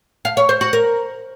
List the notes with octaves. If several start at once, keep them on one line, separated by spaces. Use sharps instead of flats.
F5
C#5
C5
F#4
A#4